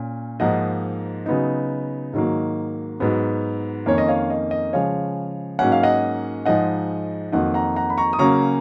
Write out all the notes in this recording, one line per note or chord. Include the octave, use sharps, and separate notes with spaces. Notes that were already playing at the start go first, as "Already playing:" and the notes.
Already playing: A#2 C#4
G#2 F3 A#3 D#4 D#5 F#5
C#3 F#3 B3 D#4
G#2 D#3 F#3 A#3
G#2 F#3 B3
F2 D#3 A#3 C#4 C#5
D#5
C#5 F5
D#5
D#5
C#3 F3 G#3 C#5 F5
G#2 F#3 A#3 C#4 F#5
F5
D#5 F#5
G#2 F3 G#3 D#4 D#5 F#5
F2 D#3 F#3 A#3 D#4 D#5 F#5
F#5 A#5
F#5 A#5
B5
A#5 C#6
D#6
C#3 F#3 A#3 C#4 A#5 C#6